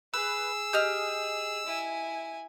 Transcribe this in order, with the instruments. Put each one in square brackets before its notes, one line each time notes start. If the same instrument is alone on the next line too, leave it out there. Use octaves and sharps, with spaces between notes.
[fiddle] G#4 [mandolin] B4 [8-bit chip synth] E6
[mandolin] G4 D#5 F6
[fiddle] E4 G#5